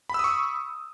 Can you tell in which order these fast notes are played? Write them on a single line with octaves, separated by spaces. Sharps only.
B5 E6 D#6 C#6